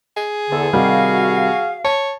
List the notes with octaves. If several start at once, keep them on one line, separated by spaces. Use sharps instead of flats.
G#4
E2 D3 A4
C3 D#3 G3 F#4 F5
C#5 A5